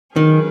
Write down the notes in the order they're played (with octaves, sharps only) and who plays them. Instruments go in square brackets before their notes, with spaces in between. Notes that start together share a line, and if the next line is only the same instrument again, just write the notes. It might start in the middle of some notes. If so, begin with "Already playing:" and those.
[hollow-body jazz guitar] D#3 [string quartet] F#3 C#4 G#4 B4